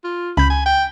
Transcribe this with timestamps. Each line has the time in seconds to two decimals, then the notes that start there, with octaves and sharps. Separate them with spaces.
0.04 F4
0.37 C#2 B5 G6
0.50 G#5
0.66 G5